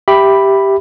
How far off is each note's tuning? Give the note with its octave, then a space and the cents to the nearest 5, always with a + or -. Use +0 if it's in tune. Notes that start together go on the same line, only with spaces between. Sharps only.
G4 +0 E5 +0 B5 +0